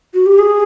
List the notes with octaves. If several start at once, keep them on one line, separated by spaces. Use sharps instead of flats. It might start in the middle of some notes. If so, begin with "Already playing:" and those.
F#4
G4
G#4